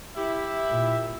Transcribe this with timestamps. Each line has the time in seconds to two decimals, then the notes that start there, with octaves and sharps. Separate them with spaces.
0.16 E4 G4 E5
0.70 A#2